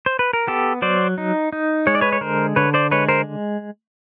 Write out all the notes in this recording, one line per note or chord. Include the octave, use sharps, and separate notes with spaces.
C5
B4
A#4
B3 G4 A4
F#3 C5 D5
D#4
D#4
G#3 C#5
D5
B4 C#5
C#5
D3 A#4 C5
D3 B4 C#5
C5 D5
G#3 B4 C#5
A#4 C5